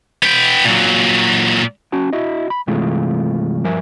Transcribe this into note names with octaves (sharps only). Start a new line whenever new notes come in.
B3 G5
A#2 F#3
C#4 F#4 G#5 A5
E4 F#4 D#5
B5
G2 C3 E3 G#3 A3 F4
G2 F3 A#4 E5 G#5